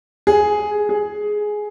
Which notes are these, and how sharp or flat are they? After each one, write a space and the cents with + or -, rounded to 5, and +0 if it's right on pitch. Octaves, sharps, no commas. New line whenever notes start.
G#4 +5
G#4 +10